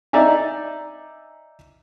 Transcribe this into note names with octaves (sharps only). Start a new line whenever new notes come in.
D#4 D5 E5 G#5 A#5